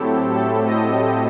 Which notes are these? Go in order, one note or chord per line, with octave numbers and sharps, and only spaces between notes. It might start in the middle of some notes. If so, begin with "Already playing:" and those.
Already playing: A2 F#3 A3 C4 E4 G4 A4
A4
D#5